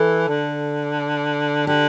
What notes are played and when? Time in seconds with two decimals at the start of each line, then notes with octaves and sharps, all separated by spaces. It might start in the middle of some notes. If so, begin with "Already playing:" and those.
Already playing: E3 A4
0.29 D3
1.67 D3 G4